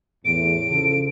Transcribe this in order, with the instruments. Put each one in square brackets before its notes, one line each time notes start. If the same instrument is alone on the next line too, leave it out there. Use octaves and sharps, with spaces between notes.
[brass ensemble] E2 A2 [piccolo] D7
[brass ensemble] C#3 F3 A4